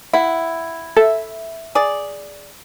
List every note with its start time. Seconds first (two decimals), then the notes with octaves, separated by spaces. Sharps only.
0.13 E4 F#5
0.97 A4 E5
1.75 G#4 D5